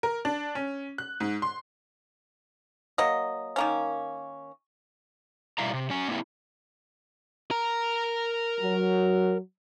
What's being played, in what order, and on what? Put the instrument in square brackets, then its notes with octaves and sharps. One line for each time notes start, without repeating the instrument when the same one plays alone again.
[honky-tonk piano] A#4
D4
C#4
F#6
G#2
C6
[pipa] F#3 A#3 D#5
D#3 A#3 C#4
[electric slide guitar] B2 G3 E4 E5 F5 A#5
C3
F#3 C#4 G#5
A#3 C4 E4
[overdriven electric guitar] A#4 A#5
[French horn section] F#3